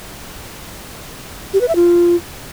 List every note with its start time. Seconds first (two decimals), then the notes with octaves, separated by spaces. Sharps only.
1.53 G4
1.61 B4
1.68 E5
1.76 F4